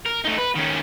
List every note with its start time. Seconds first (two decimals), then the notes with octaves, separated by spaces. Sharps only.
0.06 A#4
0.25 A3 D#4
0.38 B4
0.56 D#3 C#4